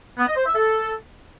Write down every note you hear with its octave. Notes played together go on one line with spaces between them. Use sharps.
B3
D#5
C5
E5
A4